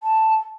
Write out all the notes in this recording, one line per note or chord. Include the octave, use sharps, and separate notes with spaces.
A5